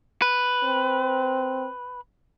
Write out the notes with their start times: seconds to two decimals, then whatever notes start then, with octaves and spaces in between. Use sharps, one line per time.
0.22 B4
0.64 C4